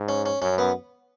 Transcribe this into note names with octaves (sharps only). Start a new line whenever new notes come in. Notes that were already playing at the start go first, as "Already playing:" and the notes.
Already playing: G#2
C#4
C#4
F#2 C#4
B3